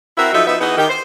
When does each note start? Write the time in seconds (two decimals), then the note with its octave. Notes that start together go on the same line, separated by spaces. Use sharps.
0.17 C4 E4 F#4 A#4 E5
0.33 F3 F#3 D#4 A4 E5
0.47 F3 B3 D#4 E5
0.61 E3 B3 D#4 F#4 G#4 D#5
0.77 D#3 G4
0.90 C5